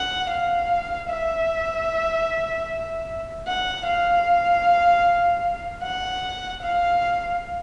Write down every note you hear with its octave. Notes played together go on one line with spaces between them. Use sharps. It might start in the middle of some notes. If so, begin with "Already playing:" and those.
Already playing: F#5
F5
E5
F#5
F5
F#5
F5